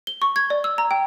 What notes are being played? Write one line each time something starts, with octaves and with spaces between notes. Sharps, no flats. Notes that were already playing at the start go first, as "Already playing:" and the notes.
G7
C#6
G#6
D5
E6
A#5
G5